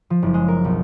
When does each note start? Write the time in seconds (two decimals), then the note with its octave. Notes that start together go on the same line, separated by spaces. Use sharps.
0.10 F3
0.23 F#1
0.34 G#3
0.48 A#4
0.64 B1